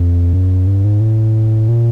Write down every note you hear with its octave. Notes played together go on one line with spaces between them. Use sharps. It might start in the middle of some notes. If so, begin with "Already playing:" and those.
Already playing: F2
F#2
G2
G#2
A2
A#2